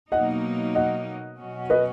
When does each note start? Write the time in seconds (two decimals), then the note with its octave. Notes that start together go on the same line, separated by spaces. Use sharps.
0.12 B2 F#3 A#3 D#4 D#5 F#5
0.75 D#5 F#5
1.38 B2 F#3 C#4 F#4
1.70 B4 D#5